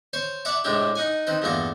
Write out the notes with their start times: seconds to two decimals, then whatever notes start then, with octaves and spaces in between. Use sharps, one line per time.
0.13 C5 C#5 C6
0.45 D5 E5 F#5 A5 D6
0.64 A2 C3 G#3 D4 E4 G4
0.95 D#4 F#5 G#5
1.27 D#3 C4 B4
1.42 E2 G2 A#2 A3 F5 A#5